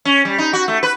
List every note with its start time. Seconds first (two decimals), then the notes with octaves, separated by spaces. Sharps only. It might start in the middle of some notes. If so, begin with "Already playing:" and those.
0.05 C#4
0.25 G3
0.38 D#4
0.53 F#4
0.68 A3
0.83 B4